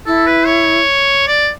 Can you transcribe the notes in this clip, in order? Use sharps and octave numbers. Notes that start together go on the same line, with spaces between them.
E4 A4
B4
C#5
D5